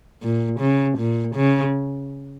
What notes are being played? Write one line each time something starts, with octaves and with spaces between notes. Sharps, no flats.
A#2
C#3
A#2
C#3